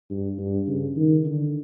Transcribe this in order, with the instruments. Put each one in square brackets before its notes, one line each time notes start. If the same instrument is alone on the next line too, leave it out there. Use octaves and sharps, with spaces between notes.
[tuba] G2
G2
C#3
D#3
D3